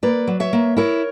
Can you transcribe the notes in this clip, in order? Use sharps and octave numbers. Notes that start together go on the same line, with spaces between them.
A#3 B4 D5
F#3
C#5 E5
A#3
E4 A#4 C#5